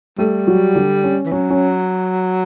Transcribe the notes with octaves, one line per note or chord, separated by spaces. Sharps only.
G3 A3 A4
F#3 F#4
D3 D4
C#4
E3
F#3 C#4
C#4